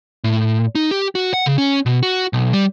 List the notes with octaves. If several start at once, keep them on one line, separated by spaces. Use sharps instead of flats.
A2
D#4
G4
F#4
F#5
C#3
C#4
B2
F#4
B1
G3